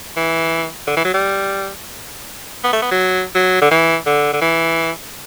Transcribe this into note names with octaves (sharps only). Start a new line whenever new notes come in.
E3
D3
E3
F#3
G3
B3
A3
B3
F#3
F#3
D3
E3
D3
D3
E3